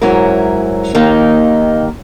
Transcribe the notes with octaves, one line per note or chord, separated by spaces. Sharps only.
G#2 F#3 C#4 E4 A#4
D#2 D#3 A#3 D#4